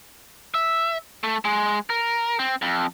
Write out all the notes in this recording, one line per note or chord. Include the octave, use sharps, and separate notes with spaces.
E5
A3
G#3
A#4
C4
F2